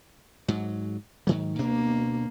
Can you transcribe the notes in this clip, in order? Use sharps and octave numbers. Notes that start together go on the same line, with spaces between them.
G#2 F#3
G#2 D#3 F#3
D2 B2 A#3 D4